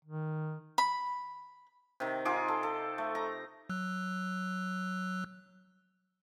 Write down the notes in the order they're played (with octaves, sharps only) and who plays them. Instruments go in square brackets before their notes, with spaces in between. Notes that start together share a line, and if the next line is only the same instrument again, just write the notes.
[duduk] D#3
[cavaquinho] B5
[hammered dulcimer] C3 D#3
D#4 F4 G#4 D6
A4
A4
A3
A#5
[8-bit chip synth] F#3 E6 F#6